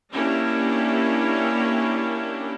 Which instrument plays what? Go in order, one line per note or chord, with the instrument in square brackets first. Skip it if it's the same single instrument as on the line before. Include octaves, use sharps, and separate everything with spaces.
[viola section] A#3 C#4 D4 E4 G4